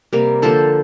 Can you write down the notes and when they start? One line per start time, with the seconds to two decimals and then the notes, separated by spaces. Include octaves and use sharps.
0.13 C3 G3 A#3
0.42 D3 F3 A#3 A4 C5